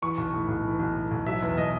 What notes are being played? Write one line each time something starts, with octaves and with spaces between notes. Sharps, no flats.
E3 C#6
B1
A2
B1
E3
B1
A2
B1
F#3 E5
E2
B2 D#5